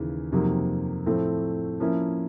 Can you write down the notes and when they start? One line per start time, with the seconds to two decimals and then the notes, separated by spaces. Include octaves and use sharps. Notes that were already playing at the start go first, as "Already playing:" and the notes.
Already playing: D#2 C#3 E3
0.32 F2 C3 D#3 F#3 A#3
1.06 A2 F3 A3 C4
1.80 F3 A#3 C#4 E4